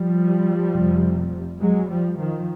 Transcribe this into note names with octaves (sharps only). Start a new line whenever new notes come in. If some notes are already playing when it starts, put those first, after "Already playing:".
Already playing: F3 G3
F1 F2 C3
F#3 G#3
F3 G3
D#3 F3